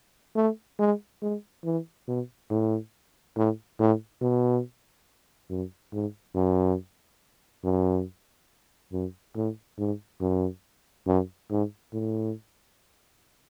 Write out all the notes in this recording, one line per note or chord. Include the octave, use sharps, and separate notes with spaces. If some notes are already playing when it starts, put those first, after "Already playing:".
A3
G#3
G#3
E3
B2
A2
A2
A2
B2
F#2
G#2
F#2
F#2
F#2
A2
G#2
F#2
F#2
G#2
A2